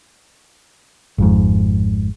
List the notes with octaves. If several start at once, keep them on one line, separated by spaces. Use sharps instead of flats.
G#1 F2 G#2